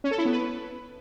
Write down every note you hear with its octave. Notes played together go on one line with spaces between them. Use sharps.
C#4
A4
E4
B3
B4